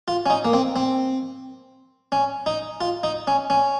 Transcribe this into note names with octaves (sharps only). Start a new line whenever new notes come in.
F4
C#4
D#4
A#3
C4
C4
C#4
D#4
F4
D#4
C#4
C#4